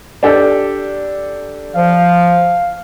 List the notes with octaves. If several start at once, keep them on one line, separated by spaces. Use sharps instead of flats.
D4 G4 A4
F3 F5